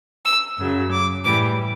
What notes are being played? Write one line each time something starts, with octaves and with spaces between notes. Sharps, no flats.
E6
F#2 C#3 F#3
D6
A2 E3 G3 D6